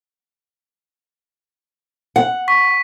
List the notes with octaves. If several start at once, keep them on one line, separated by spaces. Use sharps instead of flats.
F#5
C#6 B6